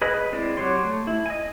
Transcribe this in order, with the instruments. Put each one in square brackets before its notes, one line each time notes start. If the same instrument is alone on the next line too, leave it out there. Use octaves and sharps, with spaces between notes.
[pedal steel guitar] G#4 B4 D#5 B5
G#3 C4 E4 D5
F#3 G4 C#5 C6
A3
E4
D#5 G#5